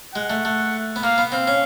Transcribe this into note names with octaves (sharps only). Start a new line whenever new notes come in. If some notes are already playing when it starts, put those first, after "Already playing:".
G#3 F#5
A3
A3
B3
A#3 F5
B3
C4 F5
C#4